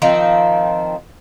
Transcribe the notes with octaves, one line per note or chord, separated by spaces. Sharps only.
D#3 F3 C4 D#4